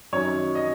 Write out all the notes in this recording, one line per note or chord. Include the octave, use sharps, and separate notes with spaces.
F#2 D#3 F#3 C#5
D#5